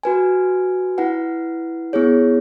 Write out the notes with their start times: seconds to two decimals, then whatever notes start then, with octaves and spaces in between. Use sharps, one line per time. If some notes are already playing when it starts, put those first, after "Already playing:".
0.03 F#4 B4 G#5
0.98 E4 B4 F#5
1.93 B3 E4 G#4 C#5